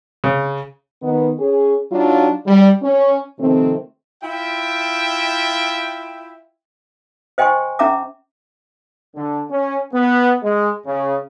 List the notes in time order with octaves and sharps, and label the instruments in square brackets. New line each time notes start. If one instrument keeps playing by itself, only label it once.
[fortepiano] C#3
[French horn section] D#3 B3
C#4 G#4
F#3 D4 D#4 F4
G3
C#4
C3 D#3 F3 A3 C4
[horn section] E4 F4 E5 G5
[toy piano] C5 D#5 G5 G#5 C6 C#6
C#4 E5 A#5 D6
[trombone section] D3
C#4
B3
G#3
C#3